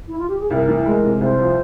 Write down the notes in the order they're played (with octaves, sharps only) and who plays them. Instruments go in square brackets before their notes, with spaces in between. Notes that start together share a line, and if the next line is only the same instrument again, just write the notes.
[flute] E4
F4
G4
G#4
[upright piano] C2 [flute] A#4
[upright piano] E3
[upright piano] G#3 [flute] A#4
[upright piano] C3
[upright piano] C2 [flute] C5
[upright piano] F3